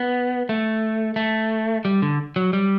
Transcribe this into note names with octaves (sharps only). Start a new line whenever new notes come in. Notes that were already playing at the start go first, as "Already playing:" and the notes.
Already playing: B3
A3
A3
G3
D3
F#3
G3